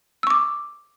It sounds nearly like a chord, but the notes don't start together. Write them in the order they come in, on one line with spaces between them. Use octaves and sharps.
E6 C#6 D6